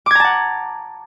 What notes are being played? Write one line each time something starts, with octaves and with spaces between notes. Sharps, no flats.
F#5 A5 A#5 D6 G#6